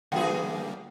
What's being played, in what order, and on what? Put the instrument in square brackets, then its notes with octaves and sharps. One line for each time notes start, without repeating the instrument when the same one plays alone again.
[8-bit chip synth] D3 G3 A#3 [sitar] E3 G#4 [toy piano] F4 F#5 [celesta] G5